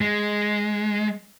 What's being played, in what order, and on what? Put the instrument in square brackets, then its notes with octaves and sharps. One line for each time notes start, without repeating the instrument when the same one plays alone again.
[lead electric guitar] G#3